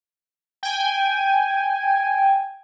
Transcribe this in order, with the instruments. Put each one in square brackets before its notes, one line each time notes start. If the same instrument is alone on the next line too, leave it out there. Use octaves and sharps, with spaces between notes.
[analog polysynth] G5 G#5